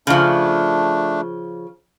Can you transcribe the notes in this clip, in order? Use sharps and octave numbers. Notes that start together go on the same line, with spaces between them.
C#3 F3 A3 D4